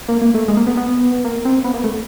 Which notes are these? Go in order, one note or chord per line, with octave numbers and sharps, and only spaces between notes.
A#3
A#3
A3
G#3
A#3
B3
B3
A#3
C4
B3
A#3
A3